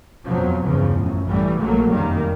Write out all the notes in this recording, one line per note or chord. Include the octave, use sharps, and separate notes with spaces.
F2 B2 F3 F#3
E2 G2 C#3 F3
A1 F#2 A2
A1 E3 G3 A3
A#1 A#2 F#3 A3 A#3
F1 F#2 D#3 G3 A#3